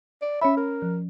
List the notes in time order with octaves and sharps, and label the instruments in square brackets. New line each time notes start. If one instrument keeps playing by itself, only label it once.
[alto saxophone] D5
[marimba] C#4 C#5 B5 [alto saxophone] E5
[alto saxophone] A#4
[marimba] F3